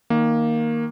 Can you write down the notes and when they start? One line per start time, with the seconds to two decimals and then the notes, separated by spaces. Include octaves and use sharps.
0.10 D#3 A#3